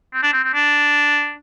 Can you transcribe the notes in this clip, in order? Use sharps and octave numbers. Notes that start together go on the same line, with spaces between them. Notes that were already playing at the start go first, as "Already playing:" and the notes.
C4
D4
C4
C4
D4